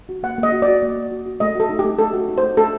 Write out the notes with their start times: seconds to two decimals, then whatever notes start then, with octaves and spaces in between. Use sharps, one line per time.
0.09 F#4
0.23 A#3 F#5
0.38 A#3
0.43 D#5
0.52 F#4
0.62 D5
0.68 F#4
0.83 A#3
0.96 A#3
1.11 F#4
1.26 F#4
1.40 A3 D#5
1.55 F#4 A4
1.69 D#4
1.79 G4
1.85 A3
1.99 A3 A4
2.14 F#4
2.28 D#4
2.38 C5
2.43 A3
2.57 A3 A4